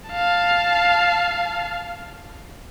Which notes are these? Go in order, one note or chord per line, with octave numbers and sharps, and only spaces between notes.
F5 A5